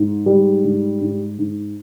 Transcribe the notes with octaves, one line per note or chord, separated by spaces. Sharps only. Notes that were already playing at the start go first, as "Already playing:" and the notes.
Already playing: G#2
G3
G#2
G#2
G#2